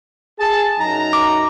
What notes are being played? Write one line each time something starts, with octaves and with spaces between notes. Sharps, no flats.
G#4 A5
F#2 D#4 A#5
D6